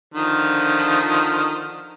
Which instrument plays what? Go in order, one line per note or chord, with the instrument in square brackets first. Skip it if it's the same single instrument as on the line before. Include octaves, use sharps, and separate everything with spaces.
[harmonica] D3 D#3 F3